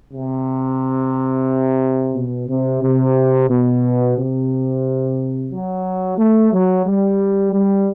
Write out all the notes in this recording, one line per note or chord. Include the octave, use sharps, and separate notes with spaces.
C3
B2
C3
C3
B2
C3
F#3
A3
F#3
G3
G3